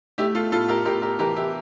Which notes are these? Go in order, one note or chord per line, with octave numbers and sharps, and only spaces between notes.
A3 E4 G4
F4 A4
A2 F4 A4
G4 A#4
A2 G4 A#4
G4 A#4
E3 G4 A#4
E4 G4